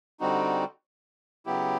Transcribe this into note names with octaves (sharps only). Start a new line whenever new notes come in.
D3 G3 C4 D#4 F#4
C#3 F#3 B3 E4 G4